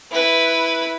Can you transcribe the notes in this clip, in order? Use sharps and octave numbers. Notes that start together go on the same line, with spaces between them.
E4 B4